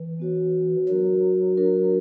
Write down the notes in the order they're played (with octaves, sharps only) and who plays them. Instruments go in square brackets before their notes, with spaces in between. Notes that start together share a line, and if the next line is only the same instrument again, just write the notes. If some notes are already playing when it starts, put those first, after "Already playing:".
Already playing: [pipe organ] E3
[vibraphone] B3 F#4 C#5
[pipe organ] F#3 [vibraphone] D4 F#4 A#4
[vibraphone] D4 F#4 A#4